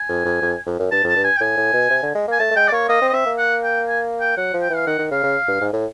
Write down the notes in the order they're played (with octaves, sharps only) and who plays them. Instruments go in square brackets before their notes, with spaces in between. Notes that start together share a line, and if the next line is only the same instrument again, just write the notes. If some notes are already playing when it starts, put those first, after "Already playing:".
Already playing: [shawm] G#5
[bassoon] F2
F2
F2
F2
F#2
[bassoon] G2 [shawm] A5
[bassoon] F2 [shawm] A5
[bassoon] G2
[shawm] G#5
G5
[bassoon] A2 [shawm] G#5
[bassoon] A2
B2
C3
D3
G#3
[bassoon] A#3 [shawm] G#5
[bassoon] A3 [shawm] A5
[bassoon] A3
[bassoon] G#3 [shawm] G5
[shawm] D5
[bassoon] A#3 [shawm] C#5
[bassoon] A#3 [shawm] D#5
[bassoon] C4
[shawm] D#5
[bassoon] C4 [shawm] E5
[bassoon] A#3
[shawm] F#5
G5
G#5
G5
[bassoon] F#3 [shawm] F#5
[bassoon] F3
[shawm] G5
[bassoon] E3
[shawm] F5
[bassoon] D#3 [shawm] F#5
[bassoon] D#3
[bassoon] C#3 [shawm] F5
[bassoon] C#3
G2
G#2
A2